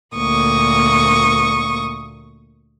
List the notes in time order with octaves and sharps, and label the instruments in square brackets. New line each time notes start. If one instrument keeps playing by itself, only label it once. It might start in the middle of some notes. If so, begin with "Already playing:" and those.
[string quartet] D2 A#2 A#3 C#6 D#6